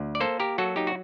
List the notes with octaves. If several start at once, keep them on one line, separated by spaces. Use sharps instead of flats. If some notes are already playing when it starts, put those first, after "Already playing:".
Already playing: D2
D5
A#3 A4 C5
G4 A#4
F#3 F#4 A4
D#4 G4
F#4